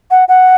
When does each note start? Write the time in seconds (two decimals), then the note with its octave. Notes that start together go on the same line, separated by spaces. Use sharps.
0.11 F#5
0.29 F#5